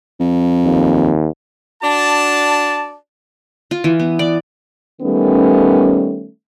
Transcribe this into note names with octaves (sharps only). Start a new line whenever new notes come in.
F2
D#2
D4 F#4 D5 A5
F4
E3
B3
D5
D#3 G3 A3 B3 C#4